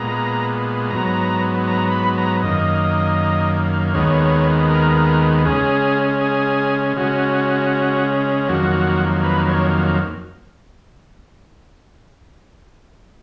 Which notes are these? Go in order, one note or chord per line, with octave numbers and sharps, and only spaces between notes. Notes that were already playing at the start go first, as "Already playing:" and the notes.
Already playing: A#2 G#3 B3 A#5
G#2 F#3 B3 A#5
A#5
B5
A#5
F#2 D#3 A#3 D#5
D#2 D#3 G#3 B3 C#5
A#4
C#3 G#3 C#4 G#4
G#4
C#3 G#3 C#4 F#4
F2 D#3 F#3 A#3 F#4
B4
C#5